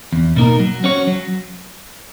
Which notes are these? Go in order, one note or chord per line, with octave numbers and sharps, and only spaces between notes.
E2
B2 A#3 D#4 A#4
F#3
C#4 F#4 C#5
F#3